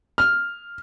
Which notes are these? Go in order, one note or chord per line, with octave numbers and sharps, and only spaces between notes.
F6